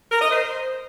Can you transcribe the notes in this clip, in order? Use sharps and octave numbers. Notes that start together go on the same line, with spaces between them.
A#4
D#5
C5